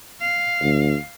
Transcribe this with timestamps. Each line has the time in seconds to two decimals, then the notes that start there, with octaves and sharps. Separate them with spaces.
0.21 F5
0.62 D2